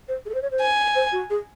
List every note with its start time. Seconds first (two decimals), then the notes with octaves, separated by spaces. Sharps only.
0.08 C5
0.26 G#4
0.29 A4
0.34 C5
0.42 C#5
0.51 C5
0.60 G#5
0.95 C5
1.12 F#4
1.30 G#4